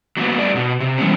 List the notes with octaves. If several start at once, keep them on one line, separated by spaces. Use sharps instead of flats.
F#3 A#3 B3
G2 A3 D5
B2
C3
E3 G3 G#3 B3 C#4